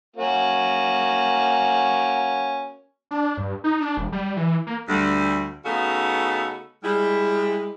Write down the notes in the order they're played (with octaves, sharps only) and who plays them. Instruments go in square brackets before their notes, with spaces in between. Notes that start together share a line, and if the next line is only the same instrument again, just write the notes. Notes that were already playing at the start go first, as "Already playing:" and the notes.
[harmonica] A#3 C#4 F#4
[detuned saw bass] D4
G2
D#4
D4
E1
G3
E3
A#3
[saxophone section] D2 G3
C#3 A3 B3 D#4 F#4 A4
G3 G#3 E4